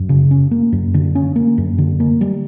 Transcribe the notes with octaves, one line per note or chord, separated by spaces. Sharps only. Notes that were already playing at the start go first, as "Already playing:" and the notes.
Already playing: F#2
C#3
C#4
A#3
F#2
D3
C#4
A#3
F#2
D3
A#3
G3